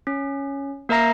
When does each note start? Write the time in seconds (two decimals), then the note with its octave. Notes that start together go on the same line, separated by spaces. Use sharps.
0.07 C#4
0.89 A#3 A#4 E5 A#5 A#6 C7